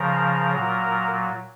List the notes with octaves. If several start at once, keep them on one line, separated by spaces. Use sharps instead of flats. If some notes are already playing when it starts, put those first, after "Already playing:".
Already playing: C#3 F3 A#4
A#2 F#3